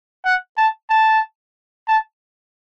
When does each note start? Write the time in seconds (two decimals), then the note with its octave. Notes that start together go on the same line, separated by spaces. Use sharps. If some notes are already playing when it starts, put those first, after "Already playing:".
0.25 F#5
0.57 A5
0.90 A5
1.87 A5